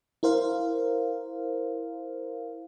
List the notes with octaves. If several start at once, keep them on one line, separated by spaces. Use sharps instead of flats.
E4 A#4 C5 F5